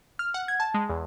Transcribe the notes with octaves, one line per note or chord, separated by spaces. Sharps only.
F6
F#5
G#6
A5
G#3
E2